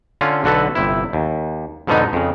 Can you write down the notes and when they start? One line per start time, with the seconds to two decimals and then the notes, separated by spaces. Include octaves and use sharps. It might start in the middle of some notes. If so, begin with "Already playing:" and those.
0.21 D3 C#4 F4
0.44 B1 D3 F#4 A4 B4
0.75 G1 C3 E4
1.13 D#2
1.87 F2 G#2 B2 D3 B3 D#4
2.13 F2 C#3